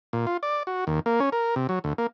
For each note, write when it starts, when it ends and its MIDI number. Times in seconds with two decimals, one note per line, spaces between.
0.13 0.26 46
0.27 0.37 65
0.43 0.63 74
0.67 0.85 66
0.87 1.00 39
1.06 1.20 58
1.20 1.30 61
1.32 1.55 70
1.56 1.67 48
1.69 1.79 54
1.84 1.93 38
1.98 2.07 58